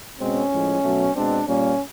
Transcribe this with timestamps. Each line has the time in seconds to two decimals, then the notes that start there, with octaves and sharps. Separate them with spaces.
0.19 B2 G#3 C4 C#4
0.51 A2 F3 G#3
0.83 B2 F#3 A3
1.15 B2 G#3 C4 D4
1.47 A#2 G3 A#3 C#4